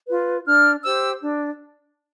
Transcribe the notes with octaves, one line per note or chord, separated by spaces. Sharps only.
F4 B4
D4 F6
G4 C5 E6
D4